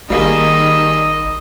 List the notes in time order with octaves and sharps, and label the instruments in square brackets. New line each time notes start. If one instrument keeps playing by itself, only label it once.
[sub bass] G#1 [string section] D#3 E6 [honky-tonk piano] G3 A#3 G#4 [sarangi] D#5